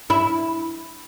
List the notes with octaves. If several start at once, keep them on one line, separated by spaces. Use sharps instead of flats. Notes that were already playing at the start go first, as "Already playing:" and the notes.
E4